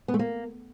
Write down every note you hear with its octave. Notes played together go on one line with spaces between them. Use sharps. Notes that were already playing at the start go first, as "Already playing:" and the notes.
B3
A3
A#3